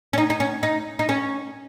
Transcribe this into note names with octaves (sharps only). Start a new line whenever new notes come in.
C#4
D#4
D#4
C#4
D#4
D#4
C#4